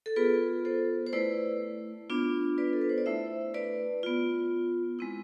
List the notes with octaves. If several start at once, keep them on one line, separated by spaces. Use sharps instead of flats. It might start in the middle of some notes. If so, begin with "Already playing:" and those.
A4
B3 F4 G#4 B4
A4 C5
C5
A3 E4 B4 D5
B3 D4 F4
B4 D5
A4
B4
C5
D5
A3 E4 C5 E5
B4 D5
B3 F4
G#3 C4 E4